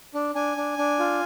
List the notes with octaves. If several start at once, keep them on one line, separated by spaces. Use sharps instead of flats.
D4
D4 G#5
D4
D4
F4